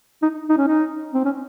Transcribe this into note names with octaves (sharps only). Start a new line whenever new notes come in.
D#4
D#4
C#4
D#4
C4
C#4